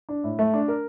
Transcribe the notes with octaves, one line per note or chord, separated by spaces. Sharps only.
D4
A2
A3
D4
A#4